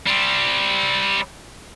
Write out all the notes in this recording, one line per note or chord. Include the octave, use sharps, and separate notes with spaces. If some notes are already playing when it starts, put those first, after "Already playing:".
G3 C4